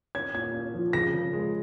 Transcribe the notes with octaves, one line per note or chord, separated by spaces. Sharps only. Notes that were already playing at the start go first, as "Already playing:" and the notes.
C#4 G#6
A#2 G#6
C#4
F3
C#3 A#6
C#3
G#3